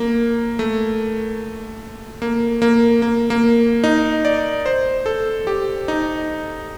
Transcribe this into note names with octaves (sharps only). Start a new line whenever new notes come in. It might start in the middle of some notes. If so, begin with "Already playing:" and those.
Already playing: A#3
A3
A#3
A#3
A#3
A#3
D#4
D5
C5
A4
G4
D#4